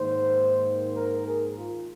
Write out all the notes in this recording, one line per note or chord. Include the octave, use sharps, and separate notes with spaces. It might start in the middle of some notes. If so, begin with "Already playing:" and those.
Already playing: G#2 D#3 A#3 C5
A#4
G#4
F4